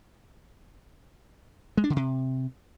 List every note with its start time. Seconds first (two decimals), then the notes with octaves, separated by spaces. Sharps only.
1.77 G#3
1.84 D4
1.90 D3
1.96 C3